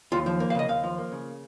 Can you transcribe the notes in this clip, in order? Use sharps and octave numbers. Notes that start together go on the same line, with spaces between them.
D#2 F4
F3
A#3
F5
C#3 D#5
D#2 F5
F3
A#3
C#3